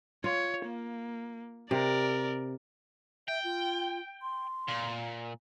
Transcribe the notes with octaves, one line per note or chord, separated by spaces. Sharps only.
F4 C#5
A#3
C3 A#4 D5
E5 G5
F4
C6
A#2